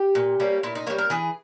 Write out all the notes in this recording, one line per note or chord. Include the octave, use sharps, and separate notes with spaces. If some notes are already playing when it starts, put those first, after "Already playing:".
Already playing: G4
A#2
G3 A#3 C#4
A#2 E4
D#4
G3 A#3 C#5
A#4
E3 G#4